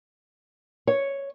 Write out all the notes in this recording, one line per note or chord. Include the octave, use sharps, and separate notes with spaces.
C#5